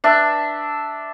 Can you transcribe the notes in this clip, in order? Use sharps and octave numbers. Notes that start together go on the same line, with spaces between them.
D4 E5